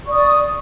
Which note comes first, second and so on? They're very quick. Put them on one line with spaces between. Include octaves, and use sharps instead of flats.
C#6 D5 D#6